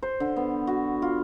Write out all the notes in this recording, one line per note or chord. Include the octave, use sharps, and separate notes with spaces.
C5
D3
B3
F#4
F4